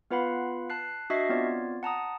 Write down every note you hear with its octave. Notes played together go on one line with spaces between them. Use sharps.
B3 F4 B4 F5 F#5 B5
A5 F#6 C7
D4 F#4 D#5 E5 C#6 C7
B3 C4 F4 C#5 D5
F#5 A5 A#5 D#6